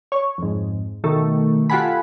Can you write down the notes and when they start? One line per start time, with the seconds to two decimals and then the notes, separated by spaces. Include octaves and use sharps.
0.12 C#5
0.38 F2 G#2
1.04 B2 D#3 A3
1.70 F4 G4 A4 F#5 G#5 B5